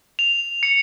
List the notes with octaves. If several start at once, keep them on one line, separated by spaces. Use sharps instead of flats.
F7
C#7